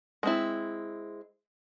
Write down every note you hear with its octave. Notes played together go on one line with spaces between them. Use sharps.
G#3 C4 E4